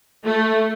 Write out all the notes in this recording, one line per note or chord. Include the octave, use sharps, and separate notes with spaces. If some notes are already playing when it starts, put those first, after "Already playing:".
A3